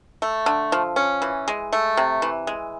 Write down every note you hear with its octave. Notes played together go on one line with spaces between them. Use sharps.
A3
D3
F3
C#4
E3
G#3
A3
C3
E3
G#3